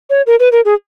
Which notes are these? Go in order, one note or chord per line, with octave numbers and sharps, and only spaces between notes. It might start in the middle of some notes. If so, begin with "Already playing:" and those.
C#5
A#4
B4
A#4
G#4